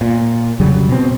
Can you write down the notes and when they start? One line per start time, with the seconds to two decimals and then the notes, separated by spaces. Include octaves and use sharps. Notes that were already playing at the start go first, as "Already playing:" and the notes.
0.01 A#2
0.60 F2 C#3 F#3 G3
0.89 B2 C4